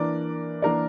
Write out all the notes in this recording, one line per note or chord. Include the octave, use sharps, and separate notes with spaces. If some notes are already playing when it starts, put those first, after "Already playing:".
Already playing: E3 A#3 D4 A#4 D5
E3 A#3 D4 A#4 D5